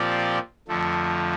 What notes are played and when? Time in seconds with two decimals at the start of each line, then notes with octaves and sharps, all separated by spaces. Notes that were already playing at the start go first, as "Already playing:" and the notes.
Already playing: A#2 F3 C4 G4 D5
0.68 F2 D3 F3 A3